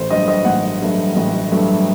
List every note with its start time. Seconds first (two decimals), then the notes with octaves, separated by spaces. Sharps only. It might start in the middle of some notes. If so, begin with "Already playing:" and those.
Already playing: A1 C5
0.10 G2 F#3 A3 D#5
0.28 D#5
0.45 A1 F#5
0.81 G2 F#3 A3
1.16 A1
1.52 G2 F#3 A3